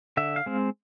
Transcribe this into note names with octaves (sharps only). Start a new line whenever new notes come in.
D3 E5
F5
G#3 C4